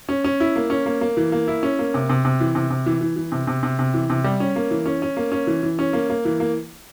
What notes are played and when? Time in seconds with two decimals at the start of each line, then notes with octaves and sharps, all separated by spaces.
0.09 C#4
0.24 C#4
0.40 E4
0.56 A#3
0.70 C#4
0.86 A#3
1.01 A#3
1.17 E3
1.32 A#3
1.48 E4
1.63 C#4
1.79 A#3
1.94 C3
2.10 C3
2.25 C3
2.40 E3
2.55 C3
2.70 C3
2.86 E3
3.01 E3
3.16 E3
3.32 C3
3.47 C3
3.63 C3
3.79 C3
3.94 E3
4.10 C3
4.24 G3
4.40 C#4
4.56 A#3
4.71 E3
4.86 C#4
5.02 C#4
5.17 A#3
5.32 C#4
5.47 E3
5.63 E3
5.79 C#4
5.93 A#3
6.10 A#3
6.25 E3
6.40 A#3